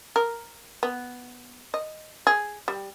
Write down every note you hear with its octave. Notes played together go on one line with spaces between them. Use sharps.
A#4
B3
D#5
G#4
G3